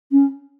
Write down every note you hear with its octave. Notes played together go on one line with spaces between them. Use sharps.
C#4